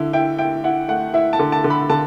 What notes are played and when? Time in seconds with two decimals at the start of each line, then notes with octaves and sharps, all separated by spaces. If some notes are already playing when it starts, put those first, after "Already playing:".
Already playing: D3 E4
0.13 E4 G5
0.38 E4 G5
0.64 E4 F#5
0.88 A3 F#5
1.14 E4 E5
1.33 A5
1.39 D3
1.52 A5
1.64 D3
1.70 B5
1.90 D3 A5